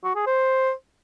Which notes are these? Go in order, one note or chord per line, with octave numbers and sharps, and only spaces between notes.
F#4
G#4
C5